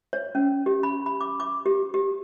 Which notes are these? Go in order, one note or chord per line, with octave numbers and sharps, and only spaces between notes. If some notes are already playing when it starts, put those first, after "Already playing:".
C#5
C#4
G4
B5
B5
D6
D6
G4
G4